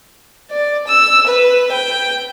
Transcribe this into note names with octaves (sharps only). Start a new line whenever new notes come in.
D5
E6
B4
G5